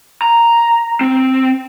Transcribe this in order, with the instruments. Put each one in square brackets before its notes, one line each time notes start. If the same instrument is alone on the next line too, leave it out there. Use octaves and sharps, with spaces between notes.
[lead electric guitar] A#5
C4